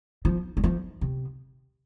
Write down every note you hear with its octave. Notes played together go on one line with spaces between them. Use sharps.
F3
G3
F3
C3